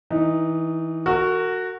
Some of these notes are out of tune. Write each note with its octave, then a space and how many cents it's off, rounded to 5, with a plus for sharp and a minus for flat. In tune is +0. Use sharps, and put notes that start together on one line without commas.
E3 -20 D#4 +0
F#4 +0 A#4 -35